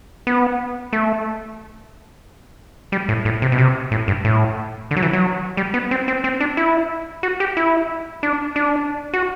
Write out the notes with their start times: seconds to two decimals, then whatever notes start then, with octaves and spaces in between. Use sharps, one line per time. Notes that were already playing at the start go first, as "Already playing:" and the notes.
0.27 B3
0.93 A3
2.92 G3
3.09 A2
3.25 A2
3.42 C3
3.52 B2
3.58 C3
3.92 A2
4.08 G2
4.25 A2
4.91 D3
4.96 F#3
5.02 E3
5.13 F#3
5.57 G3
5.74 B3
5.91 C4
6.08 C4
6.24 C4
6.41 D4
6.57 E4
7.23 F#4
7.40 G4
7.57 E4
8.23 D4
8.56 D4
9.13 F#4